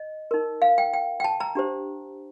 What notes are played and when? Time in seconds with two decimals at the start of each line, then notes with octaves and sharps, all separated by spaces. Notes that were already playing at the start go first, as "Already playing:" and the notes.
Already playing: D#5
0.31 D#4 A#4
0.62 F5
0.78 G5
0.93 G5
1.20 G5
1.24 A5
1.40 A#5
1.55 D4 G4 C5